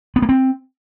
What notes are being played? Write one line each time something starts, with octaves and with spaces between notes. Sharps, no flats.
B3
A#3
C4